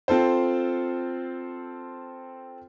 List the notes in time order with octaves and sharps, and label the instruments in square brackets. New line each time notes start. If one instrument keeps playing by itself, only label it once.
[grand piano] C4 F4 A4 C5